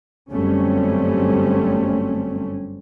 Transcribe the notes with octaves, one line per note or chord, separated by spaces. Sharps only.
G1 F#2 G3 A3 C4 C#4